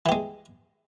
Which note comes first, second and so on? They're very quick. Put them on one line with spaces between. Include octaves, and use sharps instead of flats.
E3 G4 G#3